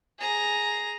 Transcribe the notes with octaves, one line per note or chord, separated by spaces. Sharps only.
G#4 A#5